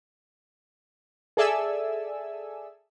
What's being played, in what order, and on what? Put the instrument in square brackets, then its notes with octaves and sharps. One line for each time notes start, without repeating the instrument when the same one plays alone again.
[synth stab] G#4 A4 D5 E5 G#5 E6